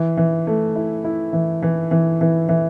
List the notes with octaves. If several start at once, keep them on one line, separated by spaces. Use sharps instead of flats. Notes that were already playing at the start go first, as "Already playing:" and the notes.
Already playing: E3
E3
A3
E4
E4
E3
E3
E3
E3
E3